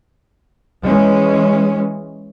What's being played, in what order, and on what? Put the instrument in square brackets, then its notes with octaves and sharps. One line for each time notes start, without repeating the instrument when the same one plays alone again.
[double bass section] E3 G#3 C#4